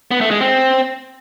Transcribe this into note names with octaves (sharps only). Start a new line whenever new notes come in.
B3
A3
G#3
C4